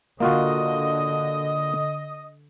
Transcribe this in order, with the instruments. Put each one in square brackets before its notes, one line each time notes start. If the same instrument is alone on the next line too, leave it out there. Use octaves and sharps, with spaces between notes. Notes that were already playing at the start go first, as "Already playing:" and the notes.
[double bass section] D3 [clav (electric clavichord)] A#3 F4 F#4 [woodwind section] D#5